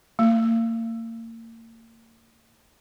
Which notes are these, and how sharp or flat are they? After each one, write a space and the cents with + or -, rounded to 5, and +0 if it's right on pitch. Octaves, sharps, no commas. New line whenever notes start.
A#3 -35